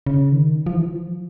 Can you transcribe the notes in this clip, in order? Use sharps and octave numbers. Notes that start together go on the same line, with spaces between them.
C#3
D#3
F3
E3
F3